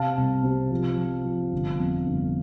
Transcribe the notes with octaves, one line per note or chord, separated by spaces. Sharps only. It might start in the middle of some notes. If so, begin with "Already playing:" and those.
Already playing: C3 F5 A5
C2
C3
F3
F3
F3
G1
F2
G1